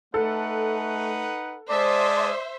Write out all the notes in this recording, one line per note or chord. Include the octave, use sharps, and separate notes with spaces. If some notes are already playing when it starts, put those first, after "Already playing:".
A3 D#4 A4 B4 F#5
G#3 C5 D5 E5 A5 D#6